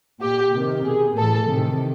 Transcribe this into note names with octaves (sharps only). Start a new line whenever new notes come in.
A#2 G4
C3 D#3
B2 G#4
A2 E3 A4
C3 D#3